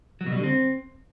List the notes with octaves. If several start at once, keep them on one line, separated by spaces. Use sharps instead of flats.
F#3
B2
G3
D3
C4